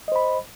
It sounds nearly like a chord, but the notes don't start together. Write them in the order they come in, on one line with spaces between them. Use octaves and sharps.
D#5 C5 B5